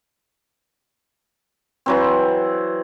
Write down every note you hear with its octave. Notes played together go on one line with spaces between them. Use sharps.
E3 F#3 C4